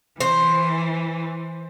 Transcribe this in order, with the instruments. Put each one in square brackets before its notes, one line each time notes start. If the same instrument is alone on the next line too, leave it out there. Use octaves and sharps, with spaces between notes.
[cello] E3 [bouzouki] C5